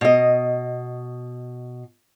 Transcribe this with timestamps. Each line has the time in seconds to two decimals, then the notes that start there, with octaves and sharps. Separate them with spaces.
0.01 B2 D#5